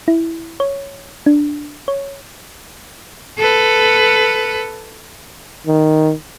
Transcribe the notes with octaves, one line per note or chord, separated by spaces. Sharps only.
E4
C#5
D4
C#5
A4 B4
D#3